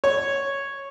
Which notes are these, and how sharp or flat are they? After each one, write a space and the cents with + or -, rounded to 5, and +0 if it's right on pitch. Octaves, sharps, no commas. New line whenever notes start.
C#5 -5